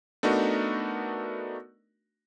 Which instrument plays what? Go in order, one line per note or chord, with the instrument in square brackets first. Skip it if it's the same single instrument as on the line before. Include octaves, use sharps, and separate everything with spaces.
[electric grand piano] A3 B3 D4 D#4 F#4 A#4